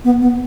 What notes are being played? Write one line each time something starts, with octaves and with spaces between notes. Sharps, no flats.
B3
B3